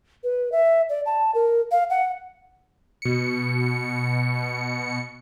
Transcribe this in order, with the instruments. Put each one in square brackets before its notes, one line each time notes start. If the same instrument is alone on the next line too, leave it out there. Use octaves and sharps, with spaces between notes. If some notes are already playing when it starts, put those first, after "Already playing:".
[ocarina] B4
E5
D5
A5
A#4
F5
F#5
[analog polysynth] B2 C#7